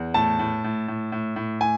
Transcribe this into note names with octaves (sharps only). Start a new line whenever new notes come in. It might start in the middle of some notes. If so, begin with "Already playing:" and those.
Already playing: E2
A2 A5
A2
A2
A2
A2
A2
A2 G#5